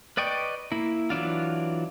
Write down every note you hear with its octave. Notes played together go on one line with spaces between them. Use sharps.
B4 D5 D#5 G5 C#6
A#3 E4
E3 F#3 D4 F4